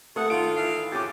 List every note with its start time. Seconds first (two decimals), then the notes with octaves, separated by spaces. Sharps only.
0.16 C3 A3 F#5 D#6
0.30 G#1 A3 F4 D7
0.57 E3 F5
0.92 F2 C#3 G4 D6 A6